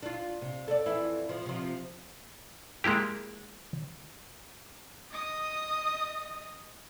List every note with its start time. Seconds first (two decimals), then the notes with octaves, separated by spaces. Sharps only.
0.03 D4 F4
0.41 C3
0.68 A4 D5
0.86 F2 E3 E4
1.29 F3
1.46 C3 F3
2.84 G#3 A#3 E4 G4
5.11 D#5 D#6